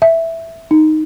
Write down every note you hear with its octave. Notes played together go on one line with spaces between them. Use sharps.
E5
D#4